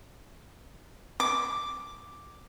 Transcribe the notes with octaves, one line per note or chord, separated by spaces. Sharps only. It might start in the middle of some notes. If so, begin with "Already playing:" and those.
D6